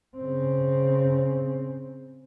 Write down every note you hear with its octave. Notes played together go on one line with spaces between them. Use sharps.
C#3 C4